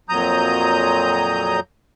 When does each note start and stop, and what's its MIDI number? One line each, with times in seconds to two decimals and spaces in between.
0.09 1.60 41
0.09 1.60 46
0.09 1.60 54
0.09 1.60 82
0.09 1.60 87
0.09 1.60 91